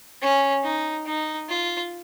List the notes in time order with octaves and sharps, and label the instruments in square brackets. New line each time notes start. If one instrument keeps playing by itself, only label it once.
[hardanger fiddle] C#4
D#4
D#4
F4